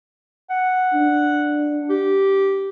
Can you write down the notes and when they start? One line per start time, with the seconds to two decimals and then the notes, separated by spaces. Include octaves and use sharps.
0.50 F#5
0.94 D4
1.89 G4